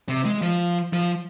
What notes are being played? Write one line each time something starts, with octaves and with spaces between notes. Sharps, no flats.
C3
G#3
F3
F3